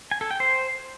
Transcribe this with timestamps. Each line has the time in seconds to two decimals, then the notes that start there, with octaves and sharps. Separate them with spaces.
0.11 G#5
0.21 A4
0.31 G5
0.40 C5